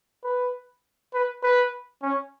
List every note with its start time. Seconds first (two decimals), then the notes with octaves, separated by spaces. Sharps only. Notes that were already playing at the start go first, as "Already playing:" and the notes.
0.24 B4
1.14 B4
1.43 B4
2.02 C#4